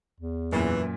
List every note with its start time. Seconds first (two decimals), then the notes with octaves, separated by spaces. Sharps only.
0.20 E2
0.52 F#2 A#2 E3